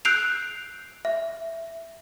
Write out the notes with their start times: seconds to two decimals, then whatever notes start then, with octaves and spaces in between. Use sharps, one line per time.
0.05 E6 F#6 G6 C7 D7 F7
1.05 E5